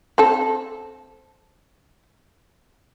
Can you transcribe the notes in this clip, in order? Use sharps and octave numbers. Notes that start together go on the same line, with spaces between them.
C4 A4